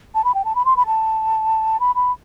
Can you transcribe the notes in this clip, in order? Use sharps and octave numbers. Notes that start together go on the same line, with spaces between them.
A5
B5
G5
A5
B5
C6
B5
A5
B5
B5